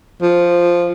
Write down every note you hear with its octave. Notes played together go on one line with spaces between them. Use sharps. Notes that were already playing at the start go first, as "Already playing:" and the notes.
F3